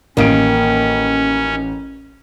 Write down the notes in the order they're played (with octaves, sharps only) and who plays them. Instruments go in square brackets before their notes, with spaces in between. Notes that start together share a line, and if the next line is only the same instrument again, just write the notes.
[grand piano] A1 D7 [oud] D#3 A#3 [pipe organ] C#4